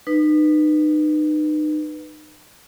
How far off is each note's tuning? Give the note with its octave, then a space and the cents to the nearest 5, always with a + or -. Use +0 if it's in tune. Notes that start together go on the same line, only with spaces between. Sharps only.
D#4 -35 B4 +0